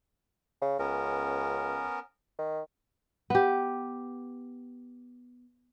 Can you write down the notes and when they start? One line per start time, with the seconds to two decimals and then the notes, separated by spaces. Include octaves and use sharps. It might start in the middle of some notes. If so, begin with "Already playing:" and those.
0.61 C#3
0.79 C#2 B3 C#4 A#4
2.39 D#3
3.30 B3 G4